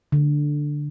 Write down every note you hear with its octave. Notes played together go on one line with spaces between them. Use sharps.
D3